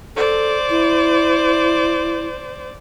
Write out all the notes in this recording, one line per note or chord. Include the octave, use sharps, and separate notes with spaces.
A4 C5 D5
E4